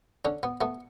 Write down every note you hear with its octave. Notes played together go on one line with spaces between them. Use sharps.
D3 C#4
B3
A3 B3